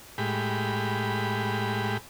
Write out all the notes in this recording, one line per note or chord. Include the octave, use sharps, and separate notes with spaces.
A2 G#3 G4 B5